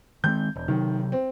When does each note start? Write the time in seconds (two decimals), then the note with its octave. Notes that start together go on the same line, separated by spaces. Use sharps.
0.24 D#3 G#3 C4 G6
0.56 E1
0.68 C3 D#3 F#3
1.12 C4